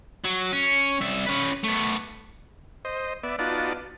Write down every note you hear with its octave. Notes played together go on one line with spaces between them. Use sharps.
F#3
C#4
C2 E5
C#4 B4
A3 B3
C5 D#5
B3 D5 E5
B3 D#4 F4 F#4 D5 A5